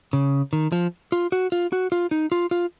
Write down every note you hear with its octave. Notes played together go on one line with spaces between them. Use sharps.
C#3
D#3
F3
F4
F#4
F4
F#4
F4
D#4
F4
F4